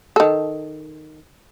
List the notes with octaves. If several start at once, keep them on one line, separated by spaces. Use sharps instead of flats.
D#3 A4